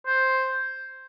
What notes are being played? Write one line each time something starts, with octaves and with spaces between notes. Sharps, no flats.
C5